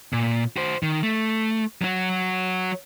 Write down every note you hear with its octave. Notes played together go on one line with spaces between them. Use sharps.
A#2
F#4 C5
D#3
A3
F#3 F#4